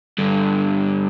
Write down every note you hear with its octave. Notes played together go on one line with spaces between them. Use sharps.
G2 D3